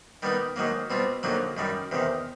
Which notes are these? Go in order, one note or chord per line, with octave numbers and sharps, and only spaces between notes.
D#3 G3 B3 D#4
G#2 D#3 F#3 A#3
B2 G3 C4 F4
F2 D3 F#3 A#3 D#4
F#2 D#3 G3
E2 C3 D#3